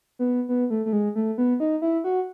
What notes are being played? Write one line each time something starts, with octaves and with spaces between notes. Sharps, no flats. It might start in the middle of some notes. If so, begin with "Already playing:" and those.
B3
B3
A3
A3
G#3
A3
B3
D#4
E4
F#4